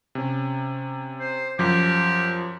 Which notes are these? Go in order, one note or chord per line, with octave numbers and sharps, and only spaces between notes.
C3 C#4
C5
F#2 F3 G4